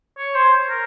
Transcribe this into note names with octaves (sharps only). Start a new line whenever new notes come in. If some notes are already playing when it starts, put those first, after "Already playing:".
C#5
C5
A#4